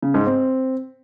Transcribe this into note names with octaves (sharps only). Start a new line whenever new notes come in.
C#3
G#2
C4